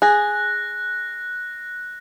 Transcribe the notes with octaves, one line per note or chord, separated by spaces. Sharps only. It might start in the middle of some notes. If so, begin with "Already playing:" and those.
G#4 F#6 A#6